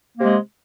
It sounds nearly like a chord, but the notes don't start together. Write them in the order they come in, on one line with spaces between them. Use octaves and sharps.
A#3 C3 G#3